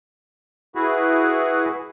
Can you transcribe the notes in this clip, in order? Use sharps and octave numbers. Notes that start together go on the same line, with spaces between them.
E4 F#4 G#4 B4